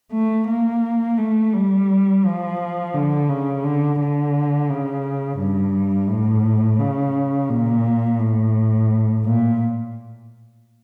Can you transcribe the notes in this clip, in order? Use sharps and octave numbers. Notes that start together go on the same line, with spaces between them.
A3
A#3
A3
G3
F3
D3
C#3
D3
D3
C#3
G2
A2
C#3
A#2
A2
A#2